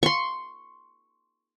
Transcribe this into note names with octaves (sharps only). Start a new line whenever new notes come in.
C6 C#6